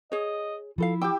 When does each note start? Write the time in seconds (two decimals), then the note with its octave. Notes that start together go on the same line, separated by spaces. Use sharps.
0.12 G#4 C#5 D#5
0.78 F3 E4 F4 A4 F5
1.01 G4 G5 D6 E6